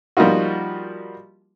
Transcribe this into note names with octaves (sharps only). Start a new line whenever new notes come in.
F3 G3 A#3 D#4 F4 F#4